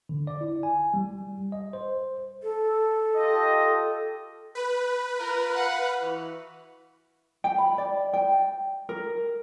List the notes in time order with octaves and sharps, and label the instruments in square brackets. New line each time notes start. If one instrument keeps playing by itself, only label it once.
[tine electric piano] D3
D5
E4
G#5
G3
D#5
C5
[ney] A4
[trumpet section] F4 G4 D#5
[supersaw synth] B4
[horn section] F4 A#4
F5 F#5
E3 F#4
[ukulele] G5
B5
D5
G5
A#4